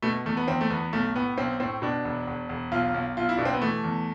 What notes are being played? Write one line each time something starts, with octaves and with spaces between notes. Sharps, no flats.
B2 A3
E2 A3
B3
E2 C4
A3
E2 B3
B1 A3
A2 B3
B1 C4
A2 C4
B2 D4
E1
E1
E1
B1 F4
B1
B1 F4
E4
B2 D4
C4
B3
E3 A3
E2